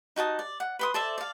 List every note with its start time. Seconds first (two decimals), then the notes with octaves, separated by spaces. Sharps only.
0.16 D#4 F#4 A5 D#6
0.39 D5
0.60 F#5
0.79 B4 C6 D#6
0.94 A4 C5 D5 E5
1.18 D5 F5